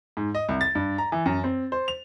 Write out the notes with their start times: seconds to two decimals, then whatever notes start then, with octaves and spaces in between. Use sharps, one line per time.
0.17 G#2
0.35 D#5
0.49 C2
0.61 A6
0.75 G2
0.98 A#5
1.12 E3
1.26 F#2
1.44 C4
1.72 C5
1.88 F7